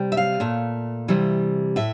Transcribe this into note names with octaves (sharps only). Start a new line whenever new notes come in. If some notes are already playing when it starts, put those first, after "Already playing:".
Already playing: C3 G3
E5
F5
A#2 A3
C3 E3 G3
A2 E5